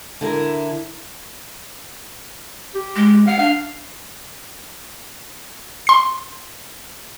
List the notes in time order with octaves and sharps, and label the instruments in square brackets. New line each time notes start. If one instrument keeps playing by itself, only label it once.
[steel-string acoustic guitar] D3 E4 A#4
[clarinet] G4
[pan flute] G#3
[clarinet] F5 [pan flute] F#5
[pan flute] D4 [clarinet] F5
[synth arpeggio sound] C6 C7